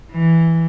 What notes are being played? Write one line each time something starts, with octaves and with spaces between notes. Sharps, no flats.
E3